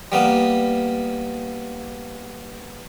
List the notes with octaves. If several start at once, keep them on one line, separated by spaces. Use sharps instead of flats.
G3 A#3 B3